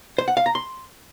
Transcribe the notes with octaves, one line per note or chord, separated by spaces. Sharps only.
C5
F#5
F5
A#5
C6